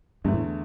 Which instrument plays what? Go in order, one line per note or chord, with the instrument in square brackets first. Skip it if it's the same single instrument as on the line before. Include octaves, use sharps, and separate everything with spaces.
[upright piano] E2 D3 A3 [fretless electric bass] G2
[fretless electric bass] A2